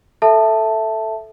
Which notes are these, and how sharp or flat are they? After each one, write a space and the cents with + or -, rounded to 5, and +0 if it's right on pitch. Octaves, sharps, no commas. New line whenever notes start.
A4 +0 E5 +0 A5 +0